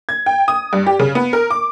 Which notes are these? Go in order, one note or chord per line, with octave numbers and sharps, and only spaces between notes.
G#6
G5
D#6
G2
G4
C#3
B3
A#4
D6